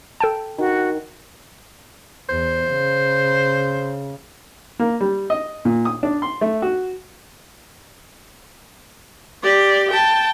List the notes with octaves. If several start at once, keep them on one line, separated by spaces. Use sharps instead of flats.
A4 G5 A5
D#3 F#4
E2 C5
C#3
A#3
G3
D#5
A#2
D#6
D4
C6
A3
F#4
G4 D5
G5 A5